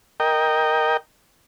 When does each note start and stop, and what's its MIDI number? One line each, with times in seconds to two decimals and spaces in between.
0.20 0.97 70
0.20 0.97 75
0.20 0.97 79